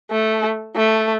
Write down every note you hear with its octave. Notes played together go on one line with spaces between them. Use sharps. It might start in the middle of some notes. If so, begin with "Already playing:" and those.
A3
A3